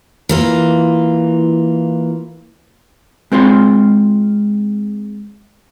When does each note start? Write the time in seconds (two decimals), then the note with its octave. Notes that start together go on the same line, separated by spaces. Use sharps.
0.29 E3 A#3 F4
3.32 G#3 C4 F4 C6